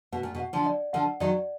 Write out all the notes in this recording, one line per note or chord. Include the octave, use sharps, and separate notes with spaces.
B2 F#5
A#2
B2
F#5
D3 F3
D5
D3 F3 F#5
D#3 F#3 D5